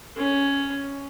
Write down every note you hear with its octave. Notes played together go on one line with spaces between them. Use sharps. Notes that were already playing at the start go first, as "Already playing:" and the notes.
C#4